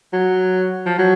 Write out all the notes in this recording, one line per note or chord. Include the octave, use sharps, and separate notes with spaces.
F#3
F3
F#3